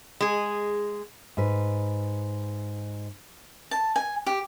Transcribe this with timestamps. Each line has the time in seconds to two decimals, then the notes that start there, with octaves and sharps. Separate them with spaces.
0.20 G#3 G#4
1.37 G#2 B4
3.71 A5
3.96 G#5
4.26 G4